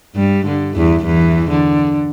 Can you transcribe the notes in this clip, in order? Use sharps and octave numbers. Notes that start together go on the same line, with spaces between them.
G2 G3
D3
E2 E3
E2 E3
D3